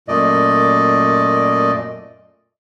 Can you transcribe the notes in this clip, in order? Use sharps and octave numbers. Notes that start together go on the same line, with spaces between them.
F#2 A#2 A3 D5 D#5